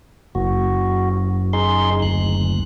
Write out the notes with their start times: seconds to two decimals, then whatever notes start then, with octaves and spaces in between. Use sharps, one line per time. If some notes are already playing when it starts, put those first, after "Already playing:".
0.35 F#1 F#4
1.53 D#4 G#4 C6
2.02 D2 F#6